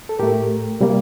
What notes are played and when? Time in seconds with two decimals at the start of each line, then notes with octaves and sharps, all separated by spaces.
0.09 A4
0.19 A2 A3 G4 A#4
0.81 C3 G3 A#3